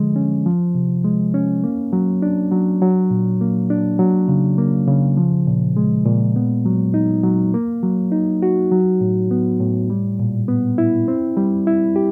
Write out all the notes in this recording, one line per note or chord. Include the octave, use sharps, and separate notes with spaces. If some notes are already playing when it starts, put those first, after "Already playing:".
Already playing: D3 F3 G#3
C#4
F3
C3
G#3
C#4
A#3
F#3
D4
F#3
F#3
A#2
A#3
D4
F#3
C#3
A#3
C#3
F3
A#2
G#3
A#2
B3
F#3
D#4
F#3
A#3
F#3
D#4
F#4
F#3
A2
B3
A2
G3
A#2
B3
E4
C4
G3
E4
G4